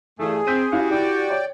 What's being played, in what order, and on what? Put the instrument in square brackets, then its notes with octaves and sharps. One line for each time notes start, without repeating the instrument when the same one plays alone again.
[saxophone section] G2 A3 [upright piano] E3 [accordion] G#4
[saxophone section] C4 [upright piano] G6 B6 D#7
[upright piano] C#4 E4 F5 [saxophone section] F#4 G4
[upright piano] E4 [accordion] D5 G5
[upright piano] C#5